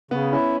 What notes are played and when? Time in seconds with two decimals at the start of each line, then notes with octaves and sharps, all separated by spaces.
0.11 C#3 B3
0.32 C#4 E4